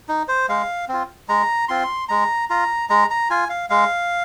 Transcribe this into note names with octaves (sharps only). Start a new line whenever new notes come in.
D#4
C5
G#3 F5
C4 F4
G#3 A#5
C4 F4 C6
G#3 A#5
F4 A#5
G#3 A#5
A#5
F4 G#5
F5
G#3 F5